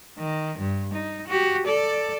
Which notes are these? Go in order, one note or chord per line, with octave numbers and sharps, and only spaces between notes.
D#3
G2
D#4
F#4 G4
A4 D5